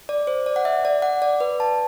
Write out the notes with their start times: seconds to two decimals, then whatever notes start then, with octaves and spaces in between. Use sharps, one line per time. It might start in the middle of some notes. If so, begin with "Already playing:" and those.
0.09 D5
0.27 C5
0.46 D5
0.56 F#5
0.65 E5
0.85 D5
1.02 F#5
1.22 D5
1.40 B4
1.60 A5